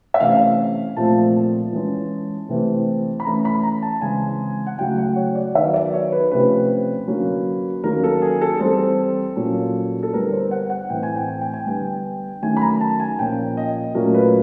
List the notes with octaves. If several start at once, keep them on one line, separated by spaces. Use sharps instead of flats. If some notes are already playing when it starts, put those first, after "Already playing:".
E5
C3 E3 A3 C#4 F5
A#2 F3 A3 C4 A5
E3 G#3 C#4
C3 E3 A3 C4
B5
E3 A3 C#4 A#5
B5
A#5
A5
C#3 E3 G#3 C4 G#5
F#5
C#3 F#3 A3 G5
F#5
C#5
D5
D#3 F#3 B3 E5
D5
C#5
B4
C3 F3 A3 C#4 B4
D3 F#3 A#3 C#4
D#3 F#3 A#3 C#4 A#4
A4
G#4
A4
E3 G3 C4 A4
A#2 F#3 A#3 C#4
A4
D3 G3 B3 A#4
C5
F#5
F#5
A2 E3 A3 C4 G5
G#5
G5
G#5
G5
G#5
D3 G3 B3 G5
D#3 F#3 A3 C#4 G#5
B5
A#5
A5
G#5
A#2 F3 A#3 C#4 G5
D#5
A#2 F#3 A3 C#4 A#4
B4